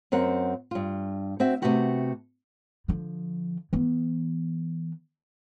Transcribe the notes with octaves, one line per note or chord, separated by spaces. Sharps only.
F#2 C4 A#4 F#5
G2 F4
C4 F#4 E5
C3 G3 A3 B3 F#4 G4
D3 F3
E3 B3